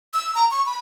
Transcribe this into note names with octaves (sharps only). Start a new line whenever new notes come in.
E6
A#5
C#6
B5